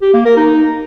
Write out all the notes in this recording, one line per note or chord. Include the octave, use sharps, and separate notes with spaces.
G4
A#3
A#4
D#4